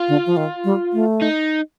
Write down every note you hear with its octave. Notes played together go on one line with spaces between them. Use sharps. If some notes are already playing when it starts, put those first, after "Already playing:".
Already playing: F4
D3
F3
D#3
G3
A3
D#4